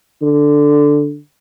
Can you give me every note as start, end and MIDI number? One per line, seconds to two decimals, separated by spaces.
0.22 1.19 50